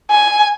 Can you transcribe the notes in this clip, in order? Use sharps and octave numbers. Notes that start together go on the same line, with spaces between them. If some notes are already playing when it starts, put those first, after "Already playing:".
G#5